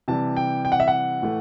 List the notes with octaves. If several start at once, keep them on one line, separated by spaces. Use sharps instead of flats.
C3 E3 G3 A5
G5
G5
F#5
E5
F#5
A2 E3 A3